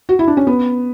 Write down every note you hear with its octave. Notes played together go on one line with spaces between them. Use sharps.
F#4
E4
D4
C#4
B3